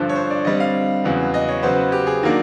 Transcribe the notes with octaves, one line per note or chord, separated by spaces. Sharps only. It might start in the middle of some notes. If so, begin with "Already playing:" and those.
Already playing: G2 D3 F3 C5
C#5
C5
D5
D3 G3 C4 D#5
F5
E2 C#3 F#3 B3
D#5
C#5
C#3 F#3 B3 C5
B4
G4
G#4
D#3 F#3 A#3 D4